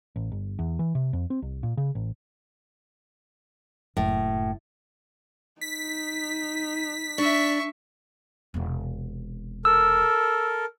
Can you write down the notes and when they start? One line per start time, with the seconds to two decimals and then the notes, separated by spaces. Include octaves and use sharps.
0.16 A1
0.32 G1
0.59 E2
0.79 E3
0.95 C3
1.13 F2
1.30 C4
1.42 C2
1.63 A#2
1.77 C#3
1.95 A1
3.97 F#1 F#2 A2
5.61 D#4 B6
7.18 D4 E5 C#6
8.54 E1 C3
9.65 A4 A#4 E6